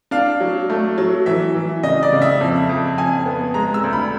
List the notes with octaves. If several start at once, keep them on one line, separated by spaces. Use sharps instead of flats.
D4 F5
F#3
A3
F#3
E3 E5
E3
C#3 D#5
D5
C#3
E5
F2
F2
F2 G#5
B3
G#3 A#5
E6
D2
B5